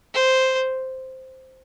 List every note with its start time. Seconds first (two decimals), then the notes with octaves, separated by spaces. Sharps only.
0.15 C5